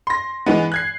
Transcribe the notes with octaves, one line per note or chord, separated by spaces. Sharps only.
C6 A#6
E3 G#3 B3
F#6 G#6 C7